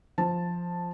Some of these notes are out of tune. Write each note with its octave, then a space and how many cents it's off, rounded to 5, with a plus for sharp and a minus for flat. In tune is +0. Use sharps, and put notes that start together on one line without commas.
F3 +0 A5 +0